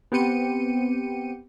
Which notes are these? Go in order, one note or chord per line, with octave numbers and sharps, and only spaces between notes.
B3 C4 G4 G5 C#7 D#7